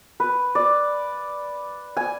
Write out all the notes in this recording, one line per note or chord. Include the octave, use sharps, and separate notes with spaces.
B4
D5
G#5